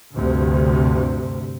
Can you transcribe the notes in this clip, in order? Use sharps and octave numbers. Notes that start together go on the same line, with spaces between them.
D2 G2 C3